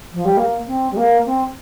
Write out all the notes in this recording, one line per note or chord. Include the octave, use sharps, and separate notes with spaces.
F3
G3
A#3
C4
G3
A#3
C4